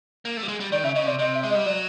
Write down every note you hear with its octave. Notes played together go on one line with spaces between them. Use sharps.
A#3
A3
G3
G#3
G3
D#3 D5
C#3 E5
C#3 D#5
C3 D5
C3 D#5
E5
G#3
D#5
G3
F#3 D5